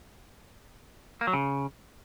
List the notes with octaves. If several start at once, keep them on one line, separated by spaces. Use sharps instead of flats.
A#3
F#3
C#3